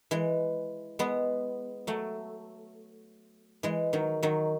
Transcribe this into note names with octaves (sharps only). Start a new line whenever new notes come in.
E3 G#3
G#3 B3
F#3 A3
E3 G#3
D#3 F#3
D#3 F#3